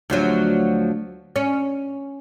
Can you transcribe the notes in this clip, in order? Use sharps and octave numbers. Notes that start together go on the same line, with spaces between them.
D2 F3 F#3
C#4